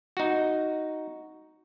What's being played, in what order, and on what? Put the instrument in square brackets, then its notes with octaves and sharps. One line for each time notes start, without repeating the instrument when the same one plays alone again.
[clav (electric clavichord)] D#4 F#4